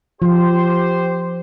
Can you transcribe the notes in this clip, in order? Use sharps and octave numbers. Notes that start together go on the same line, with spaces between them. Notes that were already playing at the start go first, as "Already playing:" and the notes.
F3 G4 C5